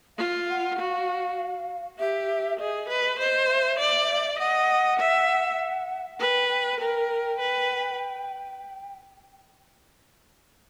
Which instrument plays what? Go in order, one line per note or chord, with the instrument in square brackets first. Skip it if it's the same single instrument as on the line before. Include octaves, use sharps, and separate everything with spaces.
[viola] F4 [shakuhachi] F5
[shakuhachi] F#5
[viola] F#4 [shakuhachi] F5
[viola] G4 [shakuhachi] E5
[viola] G#4 [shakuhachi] D#5
[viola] B4
[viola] C5 [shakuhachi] D#5
[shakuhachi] E5
[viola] D5
[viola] D#5 [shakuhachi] F#5
[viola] E5
[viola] B4 [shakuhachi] G5
[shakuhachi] G5
[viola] A#4 [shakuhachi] G5
[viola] B4